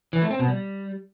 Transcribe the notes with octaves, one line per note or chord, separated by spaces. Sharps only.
E3
A3
C4
B2
G3